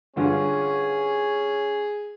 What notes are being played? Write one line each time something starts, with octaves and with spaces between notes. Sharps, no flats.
G2 D3 C#4 F4 G#4